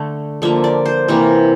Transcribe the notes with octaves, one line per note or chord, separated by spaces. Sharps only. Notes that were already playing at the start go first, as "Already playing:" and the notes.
Already playing: D3 A3
D3 F3 A#3 E5
D5
C5
C3 E3 A#3